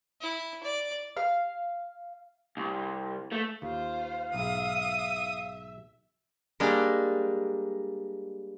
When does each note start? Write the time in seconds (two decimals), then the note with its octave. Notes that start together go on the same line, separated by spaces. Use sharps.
0.21 E4
0.63 D5
1.17 F5
2.57 C2
3.32 A3
3.62 D#2 F4 C5 F5
4.35 B1 G#2 E5 D#6
6.60 G3 G#3 A#3 D4